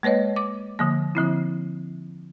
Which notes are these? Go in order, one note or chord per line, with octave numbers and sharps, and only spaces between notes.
G#3 A#3 B4 C#5 D#5
D6
D3 F3 A#3
D3 F3 C4 E4